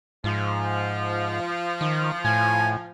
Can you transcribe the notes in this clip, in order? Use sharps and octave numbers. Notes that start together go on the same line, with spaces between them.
G#2 F3
D#3
A2 G#5